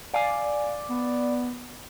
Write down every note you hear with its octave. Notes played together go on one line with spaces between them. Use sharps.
D5 F5 G#5
B3